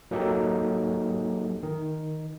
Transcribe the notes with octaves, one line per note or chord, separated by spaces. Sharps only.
F#3 A#3 D#4 G4 A4
D#3